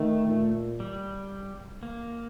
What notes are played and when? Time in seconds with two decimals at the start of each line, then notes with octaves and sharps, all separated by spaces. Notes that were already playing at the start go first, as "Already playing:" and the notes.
Already playing: D#3 A3
0.28 A#2
0.80 G3
1.83 A#3